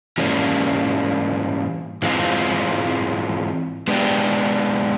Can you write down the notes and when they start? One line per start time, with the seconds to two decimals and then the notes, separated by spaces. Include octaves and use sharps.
0.18 G#2 E3 G3 A#3 C#4
2.02 G#2 E3 G#3 C4 F4
3.88 G#3 B3 D4 G4